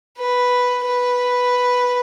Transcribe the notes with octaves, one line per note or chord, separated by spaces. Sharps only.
B4
B4